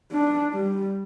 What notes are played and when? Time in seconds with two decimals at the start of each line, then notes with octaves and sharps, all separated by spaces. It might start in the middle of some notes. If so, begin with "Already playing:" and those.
0.11 D4
0.53 G3